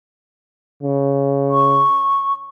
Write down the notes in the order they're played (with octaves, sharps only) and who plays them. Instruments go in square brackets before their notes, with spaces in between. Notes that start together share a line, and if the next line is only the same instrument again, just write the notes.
[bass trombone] C#3
[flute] C#6